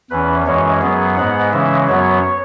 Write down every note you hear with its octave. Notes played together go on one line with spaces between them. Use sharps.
E2 E3 C#4 B4
F#2 E3 G#3 C#4 C#5
F#2 F#3 B3 G#4
G#2 G#3 B3 F#5
C#3 E3 G#3 C#4 E5
F#2 F#3 B3 C#5